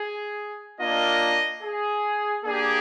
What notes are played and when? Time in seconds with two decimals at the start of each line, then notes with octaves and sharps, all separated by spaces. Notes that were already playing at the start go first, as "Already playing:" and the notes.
Already playing: G#4
0.80 A#3 D4 F4 D#5
1.63 G#4
2.45 A#3 D4 G4 G#4